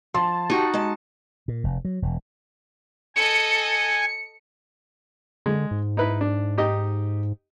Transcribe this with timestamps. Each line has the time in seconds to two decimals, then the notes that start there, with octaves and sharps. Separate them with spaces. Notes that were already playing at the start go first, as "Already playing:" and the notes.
0.14 F3 A5 C6
0.50 D#4 F#4 G4
0.74 G#3 A5
1.48 A#2
1.64 F1
1.85 F#3
2.02 E1
3.16 A4 D#5 G#5 C#7
5.46 D3 G#3
5.71 G#2
5.97 D#4 E4 B4
6.21 D4
6.58 D#4 G4 D#5